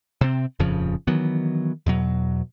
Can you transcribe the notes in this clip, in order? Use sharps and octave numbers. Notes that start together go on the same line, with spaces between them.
C3 C4
D#1 F2 C#3 F3
D#3 E3 F#3 B3
E2 B2 F#3